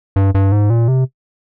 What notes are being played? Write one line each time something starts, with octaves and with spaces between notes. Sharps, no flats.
G2
G2
G#2
A#2
C3